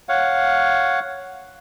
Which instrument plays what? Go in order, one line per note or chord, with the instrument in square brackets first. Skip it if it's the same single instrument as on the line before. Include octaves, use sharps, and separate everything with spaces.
[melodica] C#5 F5 F#5